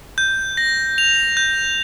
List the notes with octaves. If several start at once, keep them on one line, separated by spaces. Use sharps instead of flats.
G6
A#6
F7
G6